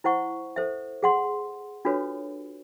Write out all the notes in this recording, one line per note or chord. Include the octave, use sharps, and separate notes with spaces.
E4 C5 F#5 C#6
A4 C5 E5
G#4 F#5 C6
D4 F4 F#4 A4 B4 C#5